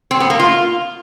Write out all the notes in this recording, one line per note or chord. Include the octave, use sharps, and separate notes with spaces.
C4
B3
A#3
F4